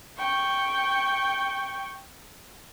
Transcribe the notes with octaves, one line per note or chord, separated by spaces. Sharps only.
G5 C#6